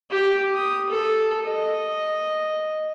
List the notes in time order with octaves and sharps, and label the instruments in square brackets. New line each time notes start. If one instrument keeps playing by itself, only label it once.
[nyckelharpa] G4
D#6
A4
D#5